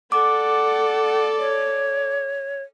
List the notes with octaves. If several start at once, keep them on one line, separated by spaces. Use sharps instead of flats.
A4 D5 F#5 D6
C#5